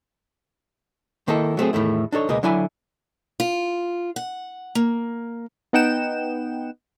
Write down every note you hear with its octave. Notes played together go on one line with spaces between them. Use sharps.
D#3 A#3 D#4 E4 A4
F#3 A3 C4 G#4
E2 A2 D#3 A3 E4
D4 D#4 A4 C#5
C#2 B2 A#3 B3 G#4 D#5
D3 F#3 E4 E5 G#5
F4
F#5
A#3
B3 D#4 F#5 G5 E7